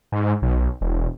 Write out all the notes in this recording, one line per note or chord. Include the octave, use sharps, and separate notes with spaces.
G#2
B1
E1